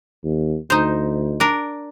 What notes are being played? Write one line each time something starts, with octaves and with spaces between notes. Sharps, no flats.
D#2
D2 D#4 C5
D4 A#4